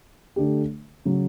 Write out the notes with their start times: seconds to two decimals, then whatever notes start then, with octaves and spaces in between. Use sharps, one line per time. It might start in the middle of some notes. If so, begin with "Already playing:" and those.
0.36 D3 A3 D4 G4
1.05 C#3 F#3